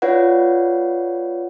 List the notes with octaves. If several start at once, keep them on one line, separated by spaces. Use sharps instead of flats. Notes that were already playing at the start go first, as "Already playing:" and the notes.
F4 B4 C#5 D5 F#5